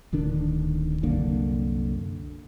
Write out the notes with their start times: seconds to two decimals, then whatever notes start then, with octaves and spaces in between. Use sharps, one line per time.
0.12 D1 D3 D#3 D4
1.03 C2 F#2 D3 A#3